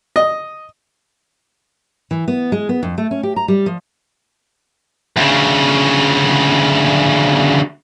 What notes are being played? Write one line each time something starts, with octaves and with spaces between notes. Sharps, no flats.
D#5
E3
B3
G#3
B3
F2
A3
C#4
G4
A#5
G3
F3
D2 C#3